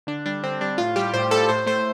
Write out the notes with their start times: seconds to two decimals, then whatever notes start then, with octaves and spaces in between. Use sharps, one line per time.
0.07 D3 D4
0.26 G3 D4
0.43 D3 C4
0.61 G3 D4
0.78 A2 F4
0.96 G3 G4
1.14 A2 C5
1.31 G3 A4
1.49 A2 C5
1.66 A3 C5